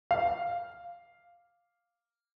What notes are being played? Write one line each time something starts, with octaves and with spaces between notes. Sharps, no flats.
F5